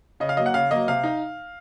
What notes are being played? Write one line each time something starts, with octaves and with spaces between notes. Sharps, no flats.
C#3 D#5
F5
F#3 A#3 D#5
F#5
C#3 F5
F#3 A#3 D#5
C3 F5
D#4